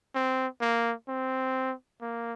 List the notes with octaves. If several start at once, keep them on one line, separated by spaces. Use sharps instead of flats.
C4
A#3
C4
A#3